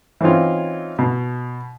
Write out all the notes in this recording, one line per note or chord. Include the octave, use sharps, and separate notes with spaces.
E3 C4 C#4 D#4 F4
B2